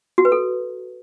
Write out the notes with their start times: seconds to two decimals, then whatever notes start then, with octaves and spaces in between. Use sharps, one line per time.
0.18 F#4
0.25 B4
0.32 A4